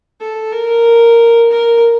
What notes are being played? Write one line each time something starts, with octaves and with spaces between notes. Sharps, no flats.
A4
A#4
A#4